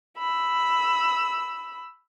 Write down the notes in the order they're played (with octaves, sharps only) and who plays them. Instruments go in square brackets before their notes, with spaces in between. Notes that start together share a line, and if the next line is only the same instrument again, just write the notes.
[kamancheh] B5 E6